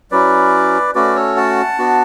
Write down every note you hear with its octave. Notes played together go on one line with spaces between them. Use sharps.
F#3 C#4 E4 B4 D5
A3 C#4 F#4 B4 D5
A4 C#5
F#5 A5
B3 D4 F#4